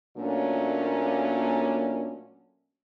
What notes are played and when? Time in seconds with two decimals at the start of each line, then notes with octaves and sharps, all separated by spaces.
0.17 A#2 F#3 A3 A#3 C#4 D4